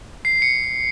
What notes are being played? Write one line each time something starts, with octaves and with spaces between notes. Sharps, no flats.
C7
C#7